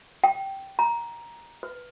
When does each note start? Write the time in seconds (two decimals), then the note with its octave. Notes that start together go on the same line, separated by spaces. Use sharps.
0.24 G5
0.79 A#5
1.63 B4